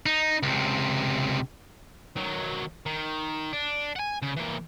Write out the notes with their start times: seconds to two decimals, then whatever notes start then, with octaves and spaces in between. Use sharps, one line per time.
0.06 D#4
0.43 C#2 C3
2.16 D#3 F#3
2.86 D#3
3.53 D4
3.96 F#5 G#5
4.22 C#3
4.37 E3 A#3